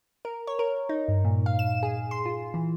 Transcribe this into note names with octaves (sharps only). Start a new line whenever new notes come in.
A#4
C#5
A#4
D#4
G2
A#2
F5
E7
G#4
C6
F4
E3